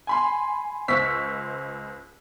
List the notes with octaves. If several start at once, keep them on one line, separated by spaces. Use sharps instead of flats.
G#5 B5 C6
C#2 C5 C#6 E6 B6